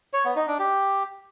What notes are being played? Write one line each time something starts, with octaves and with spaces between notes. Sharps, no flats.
C#5
B3
D#4
D4
G4